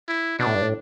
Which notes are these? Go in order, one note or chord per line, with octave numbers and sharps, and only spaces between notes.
E4
B2 D4
A2
G2
A2